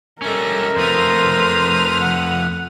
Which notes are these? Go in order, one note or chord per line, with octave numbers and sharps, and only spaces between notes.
G3 C#4 A4 A#4 D#5 E5
F2 A3 B4 C5 D#6 F6
F#5